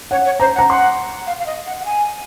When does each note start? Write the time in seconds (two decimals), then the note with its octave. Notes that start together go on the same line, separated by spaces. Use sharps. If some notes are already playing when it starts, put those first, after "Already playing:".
0.11 C#5 F#5
0.25 C#5
0.40 C5 A#5
0.55 F#5
0.59 A#5
0.70 F#5 C6
1.27 F5
1.40 F5
1.46 D#5
1.66 F#5
1.80 F#5
1.85 G#5